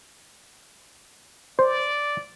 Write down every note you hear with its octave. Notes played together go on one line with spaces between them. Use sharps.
C5 D5